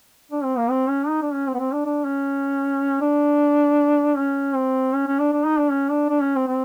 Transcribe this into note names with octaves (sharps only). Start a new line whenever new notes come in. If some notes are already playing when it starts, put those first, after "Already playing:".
D4
C4
A#3
C4
C#4
D#4
D4
C#4
C4
B3
C4
D4
D4
C#4
D4
C#4
C4
C#4
C#4
D4
D4
D#4
D4
C#4
D4
D4
C#4
C4
C4